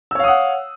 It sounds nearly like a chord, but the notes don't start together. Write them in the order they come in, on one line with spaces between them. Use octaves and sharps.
E6 C#5 F5 D#6 F#5